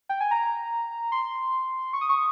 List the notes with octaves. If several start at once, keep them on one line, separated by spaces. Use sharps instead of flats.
G5
G#5
A#5
C6
C#6
D#6
C#6